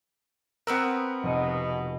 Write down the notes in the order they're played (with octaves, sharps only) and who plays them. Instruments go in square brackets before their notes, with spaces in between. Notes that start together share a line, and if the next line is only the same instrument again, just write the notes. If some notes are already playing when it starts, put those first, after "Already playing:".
[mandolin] B3 B4 E6 [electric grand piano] C4 A#4
[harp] F1 D#5 C#7 [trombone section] B2